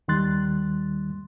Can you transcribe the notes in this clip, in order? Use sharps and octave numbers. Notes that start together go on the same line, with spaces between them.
D#2 D#3 G3 C6 F#6 A6